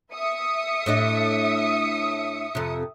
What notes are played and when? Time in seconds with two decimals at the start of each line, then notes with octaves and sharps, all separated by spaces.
0.13 E5 D#6 C#7
0.86 A2 D4 D#5
2.55 F2 C3